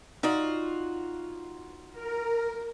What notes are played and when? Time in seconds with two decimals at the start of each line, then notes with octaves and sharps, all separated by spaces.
0.23 D#4 F4 F#4 D5
1.92 A#4